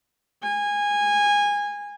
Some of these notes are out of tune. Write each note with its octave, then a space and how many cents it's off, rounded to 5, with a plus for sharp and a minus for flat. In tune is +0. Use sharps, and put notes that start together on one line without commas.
G#5 -20